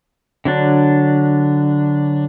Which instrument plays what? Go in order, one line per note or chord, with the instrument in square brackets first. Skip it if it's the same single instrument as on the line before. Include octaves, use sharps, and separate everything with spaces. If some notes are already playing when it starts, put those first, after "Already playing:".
[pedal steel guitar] D3 F#3 D4